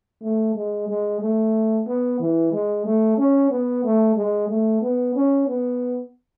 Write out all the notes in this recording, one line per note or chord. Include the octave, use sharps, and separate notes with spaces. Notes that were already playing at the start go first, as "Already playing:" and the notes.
A3
G#3
G#3
A3
B3
E3
G#3
A3
C#4
B3
A3
G#3
A3
B3
C#4
B3